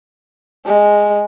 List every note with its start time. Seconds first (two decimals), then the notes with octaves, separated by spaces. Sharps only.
0.66 G#3